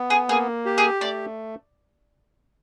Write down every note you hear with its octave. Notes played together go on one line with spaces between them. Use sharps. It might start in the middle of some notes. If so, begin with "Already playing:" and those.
Already playing: B3
G#4
A#3 G#4
G4
G#4
A3 D5